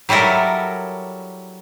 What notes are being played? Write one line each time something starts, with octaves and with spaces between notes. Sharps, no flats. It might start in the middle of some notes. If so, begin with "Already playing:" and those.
F#3 G3 E4 A4 A#4